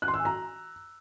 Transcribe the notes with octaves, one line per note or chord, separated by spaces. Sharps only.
F#6
C6
E6
G#5
A#5